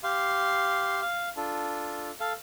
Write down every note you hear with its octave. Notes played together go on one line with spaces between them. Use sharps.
G4 F5 C6
F5
D4 F4 A4
A4 F5